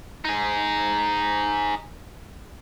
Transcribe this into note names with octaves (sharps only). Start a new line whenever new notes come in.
D#4 G#4